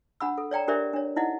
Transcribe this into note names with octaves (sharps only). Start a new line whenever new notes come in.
D4 F#5 B5 E6
A4
C#5 D5 G5 A#5
D4 G4 A#4 C5 D5 E5
D4 C#5
D#4 E4 D#5 F#5